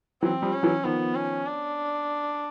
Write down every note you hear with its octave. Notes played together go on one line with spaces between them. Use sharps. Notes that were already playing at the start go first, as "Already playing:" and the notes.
E3 F#3 C4
F3 G3
C#4
E3 F#3
D#3 F3 B3
C#4
D4